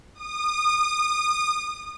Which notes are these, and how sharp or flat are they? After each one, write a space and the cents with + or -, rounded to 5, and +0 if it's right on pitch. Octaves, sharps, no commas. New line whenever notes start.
D#6 -30